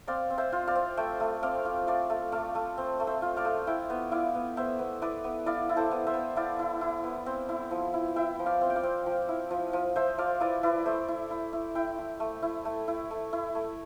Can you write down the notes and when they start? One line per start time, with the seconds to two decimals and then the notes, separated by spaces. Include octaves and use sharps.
0.08 C4 D5 F5
0.30 C4
0.38 C5 E5
0.52 F4
0.67 D5 F5
0.75 C4
0.97 A3 E5 G5
1.20 A3
1.43 C4 D5 F5
1.65 F4
1.87 A3 D5 F5
2.10 A3
2.32 A3 D5 F5
2.55 A3
2.78 C4
3.00 A3
3.07 C5 E5
3.22 F4
3.37 D5 F5
3.45 A3
3.67 E4 E5 G5
3.90 B3
4.11 E4 D5 F5
4.34 B3
4.57 B3 C5 E5
4.79 B3
5.02 E4 B4 D5
5.24 B3
5.46 E4 D5 F5
5.69 E4
5.76 A4 C5
5.91 B3
6.07 C5 E5
6.14 B3
6.36 E4 D5 F5
6.59 E4
6.81 E4
7.04 B3
7.26 C4
7.49 E4
7.71 F3
7.94 E4
8.16 E4 E5 G5
8.39 F3
8.46 D5 F5
8.61 C4
8.70 G5
8.76 D5 F5
8.83 C4
9.06 F3
9.29 E4
9.50 F3
9.73 F3
9.96 F3 C5 E5
10.18 F3 D5 F5
10.40 E4 B4 D5
10.63 E4 B4 D5
10.85 A3 C5 E5
11.08 E4
11.31 E4
11.53 E4
11.75 E4 E5 G5
11.98 E4
12.20 A3
12.42 E4
12.65 A3
12.88 E4
13.11 A3
13.33 E4
13.55 A3